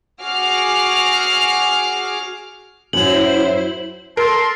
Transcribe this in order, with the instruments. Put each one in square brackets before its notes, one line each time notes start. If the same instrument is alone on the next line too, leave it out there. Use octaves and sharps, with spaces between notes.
[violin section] F#4 G#4 D6 F6 C7
[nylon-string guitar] F#2 F#3 [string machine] E4 C5 [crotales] F#7
[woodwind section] A4 A5 C6 [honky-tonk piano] A#4